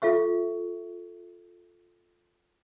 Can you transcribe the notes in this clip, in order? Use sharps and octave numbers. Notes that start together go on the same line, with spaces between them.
F4 A4 E5 C#6